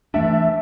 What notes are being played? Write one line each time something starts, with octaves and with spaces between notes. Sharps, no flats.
E3 A3 D4 E5